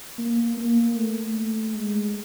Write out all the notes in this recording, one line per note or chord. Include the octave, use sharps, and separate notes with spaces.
A#3
A#3
A3
G#3